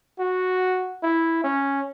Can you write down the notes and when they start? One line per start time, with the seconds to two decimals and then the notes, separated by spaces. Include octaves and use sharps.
0.20 F#4
1.03 E4
1.44 C#4